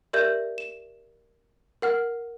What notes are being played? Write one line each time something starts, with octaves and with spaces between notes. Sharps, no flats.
G4 A#4 D5 E5 G6
E7
A#4 F#5 F6